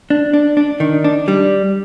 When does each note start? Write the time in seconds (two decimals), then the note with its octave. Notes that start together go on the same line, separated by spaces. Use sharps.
0.10 D4
0.34 D4
0.57 D4
0.80 D#3
1.04 D4
1.28 G3